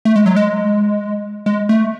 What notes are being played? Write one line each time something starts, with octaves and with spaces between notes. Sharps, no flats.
A3
G#3
F#3
G#3
G#3
A3